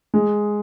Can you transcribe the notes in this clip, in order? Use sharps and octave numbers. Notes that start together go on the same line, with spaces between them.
G#3